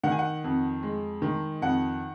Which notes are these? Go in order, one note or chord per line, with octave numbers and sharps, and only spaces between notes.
D#3 F#5
G#5
F#5
F2
G#3
D#3
F2 F#5